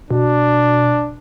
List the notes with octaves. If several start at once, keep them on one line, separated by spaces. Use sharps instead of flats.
B2 D4